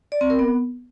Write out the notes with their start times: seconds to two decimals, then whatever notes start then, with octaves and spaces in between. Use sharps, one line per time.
0.12 D5
0.21 C4
0.30 A#4
0.39 B3